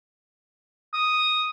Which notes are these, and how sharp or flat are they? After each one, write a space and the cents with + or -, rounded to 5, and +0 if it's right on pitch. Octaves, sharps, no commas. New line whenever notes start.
D#6 +0